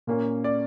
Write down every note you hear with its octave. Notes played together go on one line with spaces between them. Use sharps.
A#2 A#3 C#4
D5